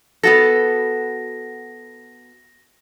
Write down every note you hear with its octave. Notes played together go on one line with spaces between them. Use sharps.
B3 F#4 A4 A#6